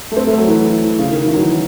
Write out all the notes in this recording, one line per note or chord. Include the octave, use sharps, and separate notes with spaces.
A3
C4
A3
F#3
E3
C#3
D#3
E3
F#3
E3